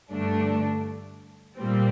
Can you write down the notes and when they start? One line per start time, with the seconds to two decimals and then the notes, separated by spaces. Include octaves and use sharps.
0.11 G2 D3 A3 D4
1.58 A#2 G3 C4